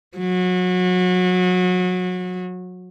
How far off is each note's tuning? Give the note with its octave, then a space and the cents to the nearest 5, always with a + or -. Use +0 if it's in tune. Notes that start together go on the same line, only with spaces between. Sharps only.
F#3 -25